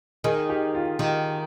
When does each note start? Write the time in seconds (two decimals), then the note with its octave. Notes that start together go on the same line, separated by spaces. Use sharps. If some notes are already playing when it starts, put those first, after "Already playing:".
0.24 D#3 G#4
0.50 G4
0.75 F4
0.99 D#3 G4